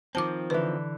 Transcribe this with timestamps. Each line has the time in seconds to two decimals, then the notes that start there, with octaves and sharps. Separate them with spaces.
0.15 D#3 F3 C4 A5 D6
0.50 D3 E3 B4